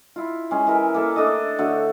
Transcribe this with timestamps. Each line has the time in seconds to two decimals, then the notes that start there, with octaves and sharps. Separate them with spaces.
0.16 E4 F4
0.51 G#3 C#4
0.67 E3 A#4 E5
0.94 A#3 A4 E5
1.16 A3 D4 A4 D#5
1.58 D3 A3 F#4 C#5